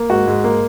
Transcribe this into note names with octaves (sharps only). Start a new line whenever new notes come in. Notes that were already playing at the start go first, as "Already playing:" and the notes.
Already playing: A#3
G#2 F#4
G#2
A#3